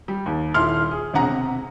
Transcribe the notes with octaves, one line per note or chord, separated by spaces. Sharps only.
G3
D#2
D#1 E4 C6 F6
G#4
E1 C3 G#4 F#5 A#5
C3